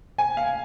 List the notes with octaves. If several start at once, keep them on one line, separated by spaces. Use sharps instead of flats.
G#5
F5